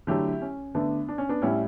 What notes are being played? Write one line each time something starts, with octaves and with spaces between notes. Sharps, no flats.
D3 F#3 A3 E4 G4
C#4
D3 A3 B3 D4
D4
C#4
B3 D4
A2 G3 C#4 E4